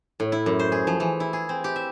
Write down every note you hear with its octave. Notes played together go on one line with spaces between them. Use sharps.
A2
E4
F#2
C5
G#4
F3
E3
E4
G#4
C4
G4
E5